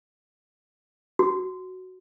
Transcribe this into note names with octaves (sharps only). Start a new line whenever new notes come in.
F#4